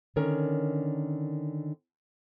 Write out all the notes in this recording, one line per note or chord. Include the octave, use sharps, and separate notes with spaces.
D3 D#3 C#4 A#4 C#5